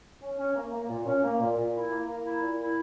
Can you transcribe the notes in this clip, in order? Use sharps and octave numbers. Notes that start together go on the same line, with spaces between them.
C#4
C#4
A#3
A#3
A#2
C#4
A#3
A#2
A#2
E4
A#3
A#3
E4
A#2
E4